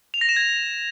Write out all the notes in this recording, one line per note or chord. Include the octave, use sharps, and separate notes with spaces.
F7
A#6
E7
G#6